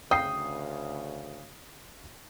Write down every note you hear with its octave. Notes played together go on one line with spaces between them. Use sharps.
D2 C#3 G5 D#6 C7